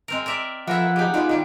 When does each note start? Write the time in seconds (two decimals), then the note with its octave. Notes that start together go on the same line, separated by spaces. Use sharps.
0.08 G#3 C4 A#4
0.26 A#4 D5 E5
0.67 E3 F3 E4 A4 A#4 E5 F#5
0.96 G3 D#4 G4 G#4
1.14 G3 G#3 B3 D#4 F4
1.29 D#3 G3